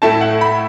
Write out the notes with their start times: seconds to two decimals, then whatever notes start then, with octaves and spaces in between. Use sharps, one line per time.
0.02 A2 A3 E4 A5
0.21 F#5
0.41 B5